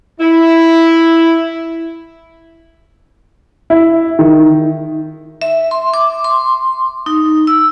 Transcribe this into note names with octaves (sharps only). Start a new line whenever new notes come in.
E4
E4
D#3
E5
C6
D6
C6
D#4
E6